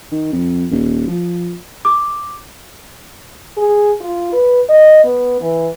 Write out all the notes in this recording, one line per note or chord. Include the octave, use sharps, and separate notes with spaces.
D#3
F2
D#1
F3
D6
G#4
F4
B4
D#5
B3
E3